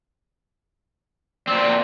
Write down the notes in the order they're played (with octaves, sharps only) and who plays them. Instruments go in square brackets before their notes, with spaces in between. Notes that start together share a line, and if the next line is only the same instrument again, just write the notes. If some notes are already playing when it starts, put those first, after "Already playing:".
[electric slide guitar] A#2 C4 [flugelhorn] D5